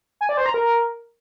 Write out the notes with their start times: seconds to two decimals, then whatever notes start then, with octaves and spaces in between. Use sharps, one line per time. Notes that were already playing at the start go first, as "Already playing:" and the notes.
0.21 G#5
0.29 D5
0.37 C5
0.46 A#5
0.54 A#4